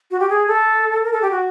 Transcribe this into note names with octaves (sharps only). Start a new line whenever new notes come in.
F#4
G4
G#4
A4
A#4
A4
G4
F#4